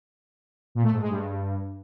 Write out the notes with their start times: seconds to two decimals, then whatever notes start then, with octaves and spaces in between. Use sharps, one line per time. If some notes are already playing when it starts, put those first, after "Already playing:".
0.75 A#2
0.84 A3
0.92 G#2
1.01 G#3
1.10 G2